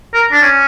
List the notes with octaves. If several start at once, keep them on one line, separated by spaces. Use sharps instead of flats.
A#4
D4
C#4